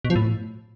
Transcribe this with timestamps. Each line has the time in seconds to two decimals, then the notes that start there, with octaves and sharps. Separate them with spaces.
0.05 B2
0.10 F3
0.16 A2